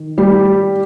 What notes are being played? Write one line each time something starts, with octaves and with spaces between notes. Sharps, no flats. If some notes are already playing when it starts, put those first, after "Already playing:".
Already playing: D#3
G3 G4